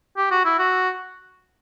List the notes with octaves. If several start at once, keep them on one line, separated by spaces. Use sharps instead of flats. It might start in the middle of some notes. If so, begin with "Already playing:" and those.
G4
F#4
E4
F#4